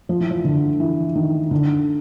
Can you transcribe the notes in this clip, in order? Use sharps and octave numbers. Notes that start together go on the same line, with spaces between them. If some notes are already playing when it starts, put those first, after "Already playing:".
F3
E3
F3
D3
E3
D#3
D3